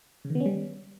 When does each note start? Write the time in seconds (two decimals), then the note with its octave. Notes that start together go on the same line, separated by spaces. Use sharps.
0.25 C#3
0.30 D#3
0.35 B3
0.40 C#4
0.46 G3